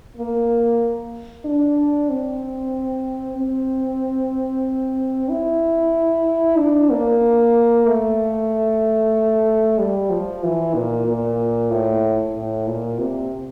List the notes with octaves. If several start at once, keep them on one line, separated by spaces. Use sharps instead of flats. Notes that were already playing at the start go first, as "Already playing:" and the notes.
A#3
D4
C4
C4
E4
D4
A#3
A3
G3
F3
E3
A#2
A#2
A2
A2
A#2
C3